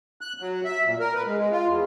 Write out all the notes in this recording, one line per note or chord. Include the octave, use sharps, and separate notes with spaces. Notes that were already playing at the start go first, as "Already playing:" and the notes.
F#6
F#3
E5
A#2
A#4
B4
G#3
G#3
F4
E2